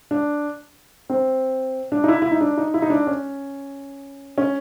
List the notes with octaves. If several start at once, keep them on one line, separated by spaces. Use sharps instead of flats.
D4
C4
D4
D#4
E4
E4
D#4
D4
D#4
E4
D#4
D4
C#4
C#4